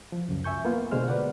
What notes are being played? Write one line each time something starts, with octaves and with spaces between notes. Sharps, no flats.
F3
C#2 F#2
E5 G#5 C#6 G6
A#3 B3 F4
B2 D3 G#3 C5 F6
B4 D5 F#5